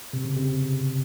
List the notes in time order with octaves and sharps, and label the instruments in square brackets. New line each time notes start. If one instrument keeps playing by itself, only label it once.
[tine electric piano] C3
C#3
C3